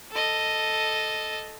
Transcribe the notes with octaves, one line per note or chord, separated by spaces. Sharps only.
A4 D#5